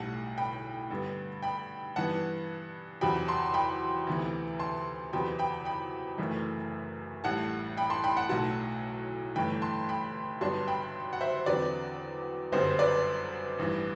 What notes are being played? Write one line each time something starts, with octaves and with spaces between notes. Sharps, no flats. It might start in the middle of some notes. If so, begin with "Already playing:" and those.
Already playing: B1 A2 G3 F#5 A5
G5 B5
G2 D3 G3 B3
G5 B5
G2 E3 B3 F#5 A5
E2 C3 F#3 G5 B5
A5 C6
G5 B5
D2 C3 E3 B3
A5 C6
E2 C3 F#3 B3 G5 B5
G5 B5
G5 B5
F#1 F#2 E3 A3
A1 A2 G3 F#5 A5
G5 B5
A5 C6
G5 B5
F#5 A5
B1 A2 F#3 F#5 A5
G1 G2 E3 A3 G5 B5
A5 C6
G5 B5
G1 G2 F#3 B3 D4 A5 C6
G5 B5
F#5
C5 E5
E2 D3 F#3 C4 B4 D5
G1 F#2 D3 G3 B3 C5
B4 D5
A1 G2 E3